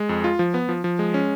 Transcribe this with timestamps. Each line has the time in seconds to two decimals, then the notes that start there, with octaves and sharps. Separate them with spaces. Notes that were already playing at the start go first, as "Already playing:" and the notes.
Already playing: G#3
0.09 F2
0.24 F4
0.39 F3
0.54 B3
0.69 F3
0.84 F3
0.99 G#3
1.14 C#4